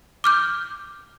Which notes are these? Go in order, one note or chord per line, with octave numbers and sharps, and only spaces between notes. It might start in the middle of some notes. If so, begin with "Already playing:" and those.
D6 F6 G6